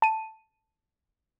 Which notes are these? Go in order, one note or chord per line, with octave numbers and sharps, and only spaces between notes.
A5 D#7